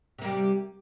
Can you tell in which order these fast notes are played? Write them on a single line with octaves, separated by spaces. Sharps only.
C3 A#3 G3